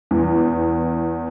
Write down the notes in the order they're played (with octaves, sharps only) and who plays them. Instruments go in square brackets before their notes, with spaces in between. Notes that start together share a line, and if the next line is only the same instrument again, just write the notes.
[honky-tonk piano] E2